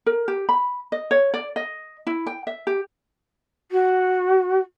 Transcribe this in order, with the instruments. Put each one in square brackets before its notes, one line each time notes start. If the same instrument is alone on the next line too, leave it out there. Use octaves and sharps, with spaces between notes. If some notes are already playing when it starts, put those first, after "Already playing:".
[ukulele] A#4
G4
B5
D#5
C#5
D5
D#5
E4
G5
E5
G4
[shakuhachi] F#4